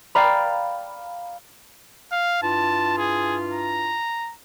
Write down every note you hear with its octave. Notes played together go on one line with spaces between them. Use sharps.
D5 F5 G5 A#5 B5
F5
G2 E4 F4 A5
G#4
A#5